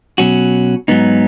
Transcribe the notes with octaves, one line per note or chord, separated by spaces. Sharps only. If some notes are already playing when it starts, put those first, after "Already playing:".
B2 F#3 C#4 F#4
G#2 F#3 B3 D#4